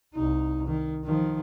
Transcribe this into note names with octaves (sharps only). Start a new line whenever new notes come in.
C2 D#4
D#3
D#3 F3